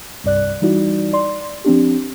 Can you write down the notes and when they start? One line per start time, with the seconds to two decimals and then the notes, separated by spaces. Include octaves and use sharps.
0.24 C2 G2 D5 F#6
0.61 E3 G3 D#4 E4 F#4 D5
1.13 D5 C6
1.64 F3 C4 D4 G4